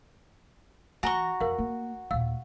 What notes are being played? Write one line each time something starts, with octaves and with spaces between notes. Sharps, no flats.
E3 F#4 G#5 A#5 C#6 G7
F2 A#4 F5
A#3
D#2 A#2 F5 E6